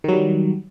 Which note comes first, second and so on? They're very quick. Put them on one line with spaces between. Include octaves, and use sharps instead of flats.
D#3 F#3 G3